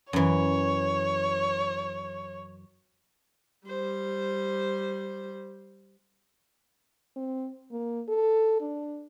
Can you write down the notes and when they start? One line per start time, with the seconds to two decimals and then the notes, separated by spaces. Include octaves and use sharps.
0.13 F#2 E3 C#5
3.67 G3 C5
7.16 C4
7.72 A#3
8.08 A4
8.61 D4